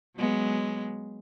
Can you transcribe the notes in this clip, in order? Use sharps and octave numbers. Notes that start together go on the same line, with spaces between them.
F#3 G#3 B3